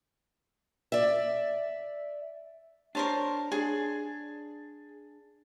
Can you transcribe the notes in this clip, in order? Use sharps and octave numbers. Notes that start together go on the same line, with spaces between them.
D5 E5
D4 A#4 C5 C#5 A5
D4 G#4